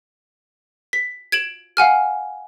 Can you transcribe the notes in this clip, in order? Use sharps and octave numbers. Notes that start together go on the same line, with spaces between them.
B6
G#6 D7 E7 F#7
F5 F#5 G#5 F6